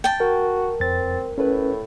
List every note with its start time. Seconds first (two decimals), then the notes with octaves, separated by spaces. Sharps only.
0.04 G5 A5
0.20 F#4 A#4
0.80 F2 C4 A6
1.38 A2 C#4 B4